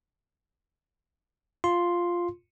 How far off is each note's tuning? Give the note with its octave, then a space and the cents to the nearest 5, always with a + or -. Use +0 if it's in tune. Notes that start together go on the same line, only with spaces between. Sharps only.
F4 +0 C6 +0